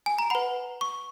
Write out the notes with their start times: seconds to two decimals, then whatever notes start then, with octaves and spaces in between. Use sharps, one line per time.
0.06 G#5
0.19 A#5
0.30 B4 F#5 B5
0.81 C#6